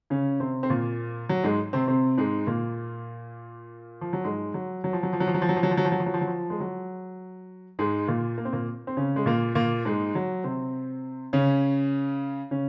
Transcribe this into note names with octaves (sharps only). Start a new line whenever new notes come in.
C#3 C#4
C3 C4
C4
A#2 A#3
F#3
G#2 G#3
C3 C4
C3 C4
G#2 G#3
A#2 A#3
F3
F#3
G#2 G#3
F#3
F#3
F3
F#3
F3
F#3
F3
F#3
F3
F#3
F3
F#3
F3
F#3
F3
F#3
F3
F#3
F3
F#3
F3
G#3
F#3
G#2 G#3
A#2 A#3
A#3
C4
A#2 A#3
C4
C#3 C#4
G#3
A#2 A#3
A#2 A#3
G#2 G#3
F#3
C3 C4
C#3 C#4
C#3 C#4